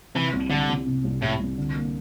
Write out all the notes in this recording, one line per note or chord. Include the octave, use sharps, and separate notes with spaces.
C3 E3
C2
D3 G3
C2
C3
C2
A2 G3
C2
D3
A#3